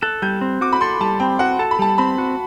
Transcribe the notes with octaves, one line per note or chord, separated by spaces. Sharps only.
A4 F#6
G3 G6
C4
F#4 D6
B5
A4 C6
G3 A5
C4 G5
F#4 F#5
A4 A5
B5
G3 A5
C4 B5
F#4